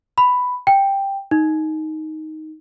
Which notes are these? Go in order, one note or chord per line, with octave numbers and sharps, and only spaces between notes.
B5
G5
D#4